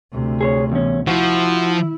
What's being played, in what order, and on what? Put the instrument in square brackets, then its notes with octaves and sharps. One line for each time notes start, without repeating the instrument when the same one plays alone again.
[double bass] D2 C3
[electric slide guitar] G#4 C5 C#5
E2 C#4
[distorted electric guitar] F3 [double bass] E4 [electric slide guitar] F#4